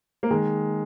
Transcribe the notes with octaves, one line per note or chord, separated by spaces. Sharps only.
A#3
D#3 G#3